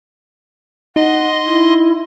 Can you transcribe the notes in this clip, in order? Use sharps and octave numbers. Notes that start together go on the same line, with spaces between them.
D#4 D#5 F#5 C6
E4